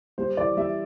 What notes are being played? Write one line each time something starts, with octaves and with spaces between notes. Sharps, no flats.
G3 C5
E3 D5
G3 E5